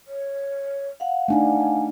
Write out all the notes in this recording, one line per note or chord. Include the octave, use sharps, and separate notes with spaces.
C#5
F5 F#5
A3 D4 D#4 G#5